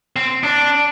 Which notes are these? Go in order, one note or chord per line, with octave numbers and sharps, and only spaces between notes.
C4
D4